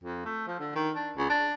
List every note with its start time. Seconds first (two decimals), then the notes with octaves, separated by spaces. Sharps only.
0.04 F2
0.25 A3
0.47 F3
0.60 D3
0.75 D#3
0.95 D4
1.17 C#2
1.30 D4